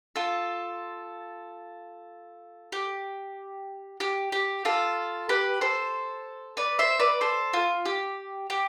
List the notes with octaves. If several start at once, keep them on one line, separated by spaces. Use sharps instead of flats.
F4 A4
G4
G4
G4
F4 A4
G4 B4
A4 C5
B4 D5
C5 E5
B4 D5
A4 C5
F4
G4
G4